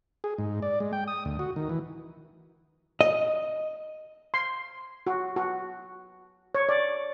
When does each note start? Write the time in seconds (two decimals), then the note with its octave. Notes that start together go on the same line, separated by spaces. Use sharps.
0.24 G#4
0.38 G#2
0.62 D5
0.80 G#3
0.93 G5
1.08 D#6
1.25 D2
1.39 F#4
1.56 D#3
1.69 E3
3.01 D#5
4.34 C6
5.07 F#4
5.36 F#4
6.55 C#5
6.69 D5